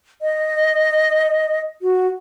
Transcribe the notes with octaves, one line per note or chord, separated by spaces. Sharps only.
D#5
F#4